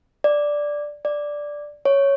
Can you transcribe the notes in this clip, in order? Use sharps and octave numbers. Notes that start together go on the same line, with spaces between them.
D5
D5
C#5